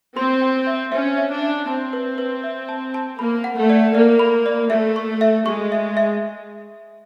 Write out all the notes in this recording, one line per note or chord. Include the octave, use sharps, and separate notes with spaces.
C4 C6
G5
E5
C#4 E5
E5
D4
E5
C4 A5
B4
B4
E5
A5
A5
A#3 B5
F#5
A3
D5
A#3 D5
B5
D5
A3 E5
C#6
E5
G#3 C#6
E5
E5